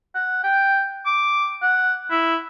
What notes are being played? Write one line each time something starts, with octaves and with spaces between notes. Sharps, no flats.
F#5
G5
D6
F#5
E4